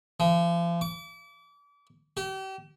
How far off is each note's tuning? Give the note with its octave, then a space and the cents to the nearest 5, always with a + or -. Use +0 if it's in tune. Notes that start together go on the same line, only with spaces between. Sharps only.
F3 -40
D6 -35
G4 -35